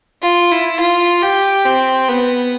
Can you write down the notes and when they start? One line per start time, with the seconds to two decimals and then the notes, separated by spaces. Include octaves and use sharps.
0.22 F4
0.51 E4
0.80 F4
1.22 G4
1.65 C4
2.08 B3